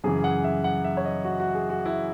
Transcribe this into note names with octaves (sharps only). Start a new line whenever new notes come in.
F#2 C#3 E3 G#4
F#5
E5
F#5
E5
C#5
D#5
F#4
F#4
G#4
F#4
E4